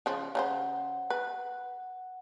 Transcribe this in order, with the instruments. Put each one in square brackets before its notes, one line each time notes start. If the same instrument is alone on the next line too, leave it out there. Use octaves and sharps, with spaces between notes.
[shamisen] C#3 F3
[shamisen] C#3 D#4 C5 [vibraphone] F#5
[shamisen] B4